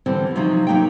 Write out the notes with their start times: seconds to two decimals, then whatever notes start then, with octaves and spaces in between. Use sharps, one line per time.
0.06 D3 E3 G3 C4
0.36 C3 F3 F#3 D#4 F#4
0.67 F#3 A#3 D#4 G4 G5